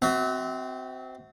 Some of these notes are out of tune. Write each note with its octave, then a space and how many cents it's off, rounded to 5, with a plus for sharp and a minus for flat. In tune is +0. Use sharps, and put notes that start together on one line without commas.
C4 -15 F#4 +20 E5 -35